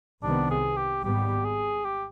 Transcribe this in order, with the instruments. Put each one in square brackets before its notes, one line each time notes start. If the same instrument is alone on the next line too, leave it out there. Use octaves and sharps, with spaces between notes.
[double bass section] C2 C3 D#3 B3 [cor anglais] D4
[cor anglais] G#4
G4
[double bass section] G#1 G#2 G3 B3 [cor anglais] G4
[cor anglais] G#4
G4